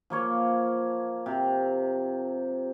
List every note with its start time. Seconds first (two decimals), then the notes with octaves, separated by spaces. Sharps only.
0.10 F3 A#3 C#5
1.26 C3